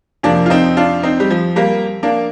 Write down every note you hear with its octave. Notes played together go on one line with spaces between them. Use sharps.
F2 C3 F3 A#3 D4
F4
C4 D#4
D4 F4
C4 D#4
G3
F3
G3 A#3
A#3 D4